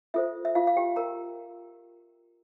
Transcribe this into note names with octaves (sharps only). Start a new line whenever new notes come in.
F4 A4 C5 E5
E5
F4 F5
F5
G4 G5
A#4 A#5